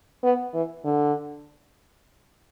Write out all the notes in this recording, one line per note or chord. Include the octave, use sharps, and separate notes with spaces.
B3
E3
D3